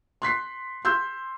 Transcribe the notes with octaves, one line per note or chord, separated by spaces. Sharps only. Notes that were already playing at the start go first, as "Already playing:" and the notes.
C6 F#6 B6 C7
C6 E6 G6